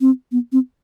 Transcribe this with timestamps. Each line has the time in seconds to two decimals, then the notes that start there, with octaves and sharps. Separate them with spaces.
0.01 C4
0.32 B3
0.52 C4